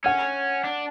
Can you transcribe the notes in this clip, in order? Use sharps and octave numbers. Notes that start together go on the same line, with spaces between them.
C#4 F#5
D4